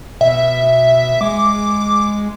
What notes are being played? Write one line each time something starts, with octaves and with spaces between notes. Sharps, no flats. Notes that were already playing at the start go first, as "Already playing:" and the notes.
B2 E5
G#3 D6